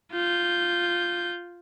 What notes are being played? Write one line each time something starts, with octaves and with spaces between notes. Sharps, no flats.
F4 G6